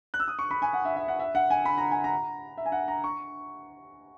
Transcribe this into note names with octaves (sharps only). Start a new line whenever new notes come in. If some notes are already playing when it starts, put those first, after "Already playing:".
F#6
E6
D#6
C#6
B5
G#5
F#5
E5
E5
F#5
E5
F#5
G#5
B5
A#5
G#5
A#5
E5
G#5
F#5
A#5
C#6